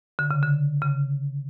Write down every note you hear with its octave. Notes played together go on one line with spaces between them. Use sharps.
D3
C#3
D3
C#3